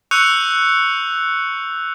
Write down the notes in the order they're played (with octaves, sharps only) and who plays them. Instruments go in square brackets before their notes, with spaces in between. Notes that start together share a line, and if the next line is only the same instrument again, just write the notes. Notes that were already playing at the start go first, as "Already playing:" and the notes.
[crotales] C#6 E6 F#6 G6 C#7 F7